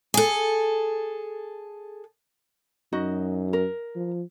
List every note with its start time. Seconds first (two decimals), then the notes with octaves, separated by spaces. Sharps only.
0.14 G#4 A4
2.93 F#2 D#4 F#4 D#5
3.53 A#4
3.96 F3